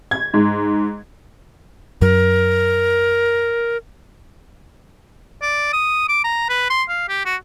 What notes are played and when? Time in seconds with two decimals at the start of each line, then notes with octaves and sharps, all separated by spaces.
0.11 G#6
0.34 G#2
2.01 F#2 F#3 A#4
5.42 D5
5.73 D#6
6.09 D6
6.24 A#5
6.49 B4
6.70 C6
6.89 F5
7.09 G4
7.25 F#4